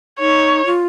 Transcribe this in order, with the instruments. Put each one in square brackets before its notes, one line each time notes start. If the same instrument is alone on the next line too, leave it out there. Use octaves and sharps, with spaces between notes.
[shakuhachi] D#4 [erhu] C#5
[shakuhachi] F4